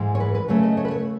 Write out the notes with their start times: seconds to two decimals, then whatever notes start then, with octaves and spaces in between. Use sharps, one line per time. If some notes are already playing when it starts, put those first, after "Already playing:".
Already playing: G#2 E3 G#3
0.15 C#5
0.20 B4
0.35 B4
0.48 C#3 F#3 A3 C#5
0.63 D#5
0.77 C#5
0.85 B4
0.91 C#5